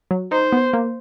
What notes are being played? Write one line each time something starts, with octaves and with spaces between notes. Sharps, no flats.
F#3
D#4 C5
B3
A#3